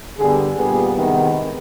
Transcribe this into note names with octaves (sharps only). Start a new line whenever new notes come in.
G2 D3 G3 B3 G#4
A#2 G3 B3 G#4
C3 D#3 G#3 B3